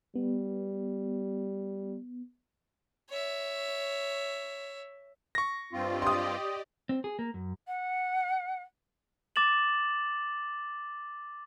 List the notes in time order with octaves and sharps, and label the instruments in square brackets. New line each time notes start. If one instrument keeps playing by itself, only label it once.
[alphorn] G3 [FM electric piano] B3
[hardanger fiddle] C#5 E5
[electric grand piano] C#6 A#6
[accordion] G2 C4 F4 [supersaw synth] G4 D5 D#5
[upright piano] C6 D#6
[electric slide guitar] C4
G#4
A#3
F#2
[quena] F#5
[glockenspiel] D6 A6 E7 F#7